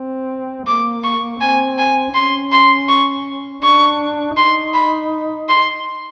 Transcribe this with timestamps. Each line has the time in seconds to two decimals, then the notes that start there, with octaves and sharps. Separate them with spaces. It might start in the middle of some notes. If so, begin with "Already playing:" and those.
Already playing: C4
0.67 A#3 D6
1.04 C#6
1.41 C4 G#5
1.79 G#5
2.14 C#4 C6
2.52 C6
2.89 C#6
3.63 D4 C#6
4.37 D#4 C6
4.74 B5
5.49 C6